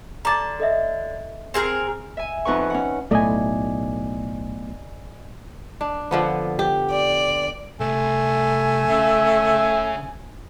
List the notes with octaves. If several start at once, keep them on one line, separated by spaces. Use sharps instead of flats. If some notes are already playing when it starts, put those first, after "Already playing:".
D3 A5 A#5 D6 A6
A4 D#5 E5
C4 G#4 A#4
E5 G#5
F2 D#4 B4 F#5 C#6
C#4 F#5
B1 A2 A3 D5 D#5 G#5
D4
D3 F3 B3
G4
D5
C2 C3 A3 G#5
C#3 E5